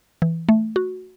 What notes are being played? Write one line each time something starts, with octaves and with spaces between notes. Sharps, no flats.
E3
A3
F#4